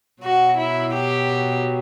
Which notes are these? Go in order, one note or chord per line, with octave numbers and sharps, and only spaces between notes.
B2 F#3 F#4
E4
G4